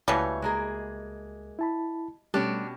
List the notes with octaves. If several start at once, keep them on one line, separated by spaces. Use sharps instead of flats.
C#2 B2 E3 G3 A3 C#5 F5
G#3 A#3 G#4
E4 A5 B5
B2 G3 A3 C#4 D4 G4